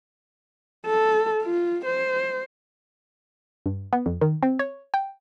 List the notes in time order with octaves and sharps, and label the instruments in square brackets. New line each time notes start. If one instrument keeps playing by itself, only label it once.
[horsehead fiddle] A4
F4
C5
[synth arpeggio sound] G2
B3
F2
D#3
C4
C#5
G5